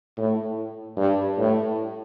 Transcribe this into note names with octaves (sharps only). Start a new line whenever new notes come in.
A2
G2
A2